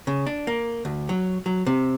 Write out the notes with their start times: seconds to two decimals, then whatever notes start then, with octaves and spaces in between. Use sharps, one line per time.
0.07 C#3
0.27 D4
0.47 A#3
0.85 D2
1.09 F#3
1.46 F#3
1.66 C3